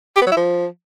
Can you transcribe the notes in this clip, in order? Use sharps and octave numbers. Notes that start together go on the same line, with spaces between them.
G4
B3
F#3
E4
F3